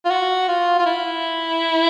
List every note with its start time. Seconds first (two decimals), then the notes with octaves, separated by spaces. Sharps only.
0.05 F4
0.11 F#4
0.48 F4
0.79 F4
0.86 E4